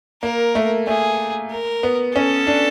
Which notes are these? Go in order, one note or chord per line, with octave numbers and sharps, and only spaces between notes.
A#3 A#4
A3
A3 G#4
A#4
B3
C#4 A4
D4